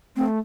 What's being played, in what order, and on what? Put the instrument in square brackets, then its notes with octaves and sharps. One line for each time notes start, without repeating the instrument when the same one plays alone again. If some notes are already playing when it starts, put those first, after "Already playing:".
[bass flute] A3 [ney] C4